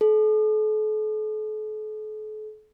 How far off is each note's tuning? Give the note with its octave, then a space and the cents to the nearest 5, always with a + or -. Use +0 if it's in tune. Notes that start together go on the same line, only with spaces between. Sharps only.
A4 -40